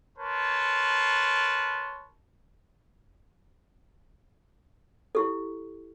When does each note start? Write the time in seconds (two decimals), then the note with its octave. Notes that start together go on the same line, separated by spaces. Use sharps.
0.18 A#4 B4 C#5 A5 C6
5.15 E4 G4 A4